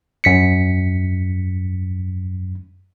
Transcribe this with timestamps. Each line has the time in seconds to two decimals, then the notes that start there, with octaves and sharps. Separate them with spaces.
0.24 F#2 B6 C#7